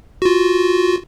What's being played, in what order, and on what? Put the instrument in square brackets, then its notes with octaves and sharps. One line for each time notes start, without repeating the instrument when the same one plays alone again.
[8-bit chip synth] F4 F#4